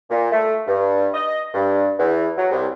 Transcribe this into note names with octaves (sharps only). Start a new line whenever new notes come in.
A#2
A3
G2
D#5
G2
E2
F#3
C2